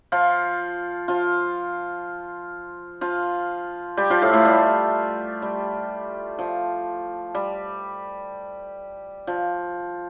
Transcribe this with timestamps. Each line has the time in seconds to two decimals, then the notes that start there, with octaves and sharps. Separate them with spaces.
0.12 F3 F4
1.08 F3 F4
3.01 F3 F4
3.97 G3 G4
4.10 F3 F4
4.22 A2 A3
4.33 A2 A3
4.45 G3
5.42 G3
6.39 F3
7.35 G3
9.27 F3